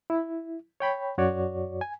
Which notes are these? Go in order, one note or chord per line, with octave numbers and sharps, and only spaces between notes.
E4
C#5 G5 B5
F#2 F#4 C#5 D5
G#5